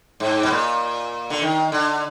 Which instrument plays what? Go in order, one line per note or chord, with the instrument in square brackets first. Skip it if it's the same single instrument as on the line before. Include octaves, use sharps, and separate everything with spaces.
[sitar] G#2
B2
A#2
D3
D#3
D3